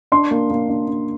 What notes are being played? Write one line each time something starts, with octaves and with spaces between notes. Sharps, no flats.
D4 C6
A#3
A#3
D4
D4